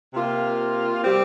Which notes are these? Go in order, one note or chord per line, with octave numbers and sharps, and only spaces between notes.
C3 A#3 F4
G3 C4 G4